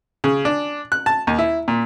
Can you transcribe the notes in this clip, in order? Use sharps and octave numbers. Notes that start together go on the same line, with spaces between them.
C#3
D4
F#6
A5
D#2
E4
A#2